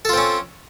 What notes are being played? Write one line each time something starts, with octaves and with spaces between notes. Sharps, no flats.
C4 C#4 F4 A4